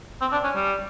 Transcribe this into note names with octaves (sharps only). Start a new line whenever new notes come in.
C4
D4
C#4
G3